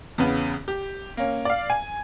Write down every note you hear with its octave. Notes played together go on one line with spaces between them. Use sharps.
E2 C#3 B3
G4
A#3 C#4
D5 F5
G#5